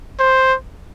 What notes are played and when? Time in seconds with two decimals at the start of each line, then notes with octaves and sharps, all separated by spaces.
0.20 C5